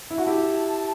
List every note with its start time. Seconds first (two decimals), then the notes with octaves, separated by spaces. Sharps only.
0.10 E4
0.18 F#4
0.27 E4 G4 A5